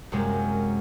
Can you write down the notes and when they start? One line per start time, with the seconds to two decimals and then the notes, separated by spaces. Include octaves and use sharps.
0.12 F#2 C3 G#3 A#3